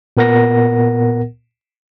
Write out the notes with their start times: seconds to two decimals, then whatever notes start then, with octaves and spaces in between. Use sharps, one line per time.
0.17 A#2 B3 A#4 F#5 A#6